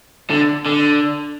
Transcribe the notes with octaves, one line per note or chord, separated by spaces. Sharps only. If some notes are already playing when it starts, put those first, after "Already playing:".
D3
D3